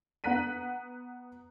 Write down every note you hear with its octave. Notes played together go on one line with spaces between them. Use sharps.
B3 F#5 A#5 F#6 B6 D#7